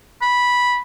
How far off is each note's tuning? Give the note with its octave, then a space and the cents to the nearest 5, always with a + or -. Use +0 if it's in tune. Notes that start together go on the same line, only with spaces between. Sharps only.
B5 -10